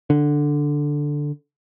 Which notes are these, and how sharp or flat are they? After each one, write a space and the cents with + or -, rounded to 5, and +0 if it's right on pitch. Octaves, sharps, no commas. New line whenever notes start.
D3 +0